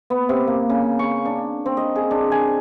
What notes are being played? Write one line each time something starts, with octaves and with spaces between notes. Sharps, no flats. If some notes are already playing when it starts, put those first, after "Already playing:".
B3
C3
A#3
C#3
C#6
D4
C4
D#5
G#4
D4
G#5